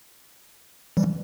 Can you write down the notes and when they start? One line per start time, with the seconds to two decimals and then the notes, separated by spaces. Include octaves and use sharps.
0.97 E3 G3